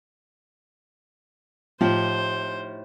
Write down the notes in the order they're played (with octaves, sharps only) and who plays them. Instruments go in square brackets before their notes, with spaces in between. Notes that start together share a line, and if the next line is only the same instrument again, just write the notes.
[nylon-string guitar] A2 D#4 G4 [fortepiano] F3 [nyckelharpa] C5